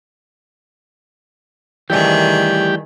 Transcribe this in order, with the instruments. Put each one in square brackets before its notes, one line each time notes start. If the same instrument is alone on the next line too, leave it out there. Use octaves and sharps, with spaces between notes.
[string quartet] D#3 G#4 [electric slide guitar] E3 G3 A3 [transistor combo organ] G4